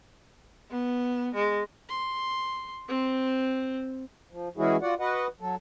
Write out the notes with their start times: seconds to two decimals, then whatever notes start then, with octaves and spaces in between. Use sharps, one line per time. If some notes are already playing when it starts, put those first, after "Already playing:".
0.71 B3
1.35 G#3
1.89 C6
2.88 C4 C5
4.31 F3
4.57 E3 G#3 C#4 E4 F#4 G#4
4.82 F4 F#4 D5 F#5
5.00 F#4 B4 D#5 F#5
5.40 F#3 A4